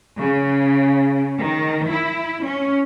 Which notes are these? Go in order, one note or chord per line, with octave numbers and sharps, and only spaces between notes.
C#3
D#3
E4
C#4